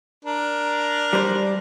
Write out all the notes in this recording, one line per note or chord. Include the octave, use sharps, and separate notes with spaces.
D4 A#4
G3 C5